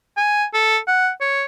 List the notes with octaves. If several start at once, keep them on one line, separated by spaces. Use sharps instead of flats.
G#5
A4
F#5
C#5